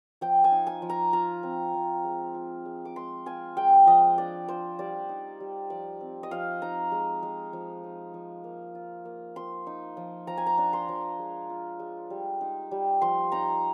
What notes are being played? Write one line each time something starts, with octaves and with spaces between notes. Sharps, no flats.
F3 G5
G#5
D#4
G#5
F3
A#5
F4 A#5
C4
F3
G#3
F4
G#3
D6
G#3 C6
F4 G#5
G#3 G5
F3 D#5
D4 D5
F3 C5
G3 D5
D#4
G3
F3 D5
C4
D#5
F3 F5
D#4 A#5
G#3
G#3
F3
D#4
F3
A#3
F4
A#3
F3 C6
D#4
F3
F3 A#5
G#5
A#5
D4
C6
F3
G#3
F4
G#3
G3
D#4
G3
F3 C6
D#4 A#5